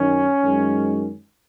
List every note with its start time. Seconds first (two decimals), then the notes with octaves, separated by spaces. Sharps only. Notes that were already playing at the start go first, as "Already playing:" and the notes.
Already playing: F#2 D#3 C#4
0.42 F#2 D#3 G#3